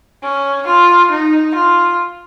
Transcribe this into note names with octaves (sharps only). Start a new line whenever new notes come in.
C#4
F4
D#4
F4